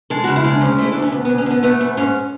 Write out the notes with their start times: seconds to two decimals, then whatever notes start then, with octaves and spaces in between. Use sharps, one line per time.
0.10 G#3 A4
0.24 F#4
0.27 C#3
0.36 E4
0.44 G#3 D4
0.61 D2 C#4
0.78 A3 E4
0.92 D2 D4
1.02 C#4
1.12 D2 B3
1.25 B3
1.29 D2
1.38 C#4
1.46 D3 B3
1.63 A3 B3
1.80 G#2 B3
1.97 G#2 C#4